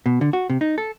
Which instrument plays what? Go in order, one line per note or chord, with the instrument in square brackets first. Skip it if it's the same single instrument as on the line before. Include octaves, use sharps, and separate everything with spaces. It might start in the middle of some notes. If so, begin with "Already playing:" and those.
[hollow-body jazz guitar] B2
D3
F#4
C3
D#4
A4